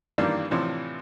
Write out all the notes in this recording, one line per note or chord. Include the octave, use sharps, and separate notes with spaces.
G2 D#3 E3 G3 A#3 D4
A2 C3 E3 F3 D4